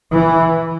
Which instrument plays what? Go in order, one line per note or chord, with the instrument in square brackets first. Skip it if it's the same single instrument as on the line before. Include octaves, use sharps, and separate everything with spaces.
[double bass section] E3